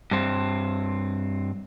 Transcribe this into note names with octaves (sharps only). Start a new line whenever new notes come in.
G2 C4